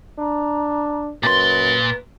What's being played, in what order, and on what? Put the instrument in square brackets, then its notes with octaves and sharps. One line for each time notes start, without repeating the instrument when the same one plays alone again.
[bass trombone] D4 [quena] A#5
[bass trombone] F#2 [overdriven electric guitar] A#2 C6 [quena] B4 [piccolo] A6